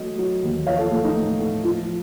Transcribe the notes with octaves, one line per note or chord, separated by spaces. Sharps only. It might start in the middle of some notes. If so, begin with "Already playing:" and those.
Already playing: F#3 A3 D#5
F#3
D#2
F3 C#5 F5
F4 A4
A3 F4
D#4
A2
A2
F3 F4